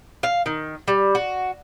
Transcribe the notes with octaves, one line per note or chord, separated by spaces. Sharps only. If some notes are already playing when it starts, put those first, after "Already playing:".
F5
D#3
G3
F#4